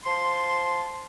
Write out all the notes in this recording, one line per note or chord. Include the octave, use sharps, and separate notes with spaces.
F3 A5 C6